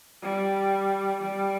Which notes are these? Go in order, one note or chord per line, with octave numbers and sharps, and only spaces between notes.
G3
G3